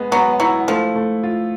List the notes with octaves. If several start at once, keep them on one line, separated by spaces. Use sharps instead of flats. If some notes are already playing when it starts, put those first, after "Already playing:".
Already playing: G#3 B3
F#3 B3
F#3 E4
F3 A3
A3
F4